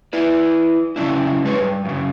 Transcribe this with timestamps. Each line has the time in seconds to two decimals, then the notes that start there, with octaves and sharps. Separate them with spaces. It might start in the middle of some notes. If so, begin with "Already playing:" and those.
0.13 E4 B4 D5
0.96 C#3 F#3 C#4 D4 E4
1.45 G#3 G#4 B4 C#5
1.60 G2
1.85 F#2 C#3